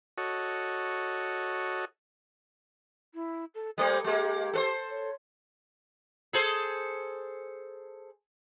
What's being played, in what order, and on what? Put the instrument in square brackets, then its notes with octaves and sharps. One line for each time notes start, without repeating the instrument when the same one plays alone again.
[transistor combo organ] F#4 A4 C#5 D#5
[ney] E4
A4
[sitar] G3 A3 A#3 [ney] C5
[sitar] G#3 A#3 [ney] G4
[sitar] A4 B4 C5
[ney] C#5
[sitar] G#4 A4 C5